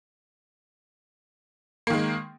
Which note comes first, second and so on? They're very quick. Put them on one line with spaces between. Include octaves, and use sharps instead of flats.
A#3 D#3 G#3